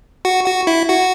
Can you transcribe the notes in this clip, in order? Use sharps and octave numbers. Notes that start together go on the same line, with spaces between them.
F#4 F#5
F#4 F#5
E4 E5
F#4 F#5